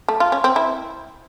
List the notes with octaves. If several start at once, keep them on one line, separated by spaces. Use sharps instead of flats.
A3
F4
C#4
C4
E4